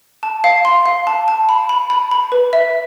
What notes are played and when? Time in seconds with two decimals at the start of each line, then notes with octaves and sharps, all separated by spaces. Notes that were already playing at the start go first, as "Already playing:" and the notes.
0.23 A5
0.44 F5
0.65 C6
0.86 F5
1.07 A5
1.28 A5
1.49 B5
1.69 B5
1.90 B5
2.11 B5
2.32 B4
2.53 E5